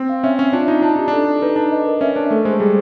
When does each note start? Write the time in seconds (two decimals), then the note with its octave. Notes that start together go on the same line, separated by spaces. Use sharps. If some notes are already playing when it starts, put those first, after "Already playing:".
Already playing: C4
0.09 F5
0.24 C#4 E5
0.39 C#4 E5
0.53 D4 F4
0.68 D#4 F4
0.82 D4 A5
0.96 D#4 G4
1.08 D4 A4
1.28 A4
1.42 D#4 B4
1.56 D4 B4
1.72 D#5
1.86 A#4
2.01 C#4 E5
2.16 D4 B4
2.31 A3 A4
2.45 G#3 C5
2.60 G3 G#4